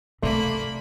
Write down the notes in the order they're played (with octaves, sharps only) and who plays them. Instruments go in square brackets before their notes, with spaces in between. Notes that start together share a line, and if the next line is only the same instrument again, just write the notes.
[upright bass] C3 [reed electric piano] A3 D5 C6 [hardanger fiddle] A#3 B5